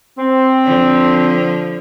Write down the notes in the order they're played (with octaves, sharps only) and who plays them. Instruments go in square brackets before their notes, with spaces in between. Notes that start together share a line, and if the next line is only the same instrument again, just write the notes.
[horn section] C4
[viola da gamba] D3 F3